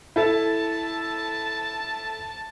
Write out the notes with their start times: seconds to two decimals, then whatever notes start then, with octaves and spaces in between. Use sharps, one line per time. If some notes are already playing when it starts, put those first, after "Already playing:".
0.16 E4 A4 A5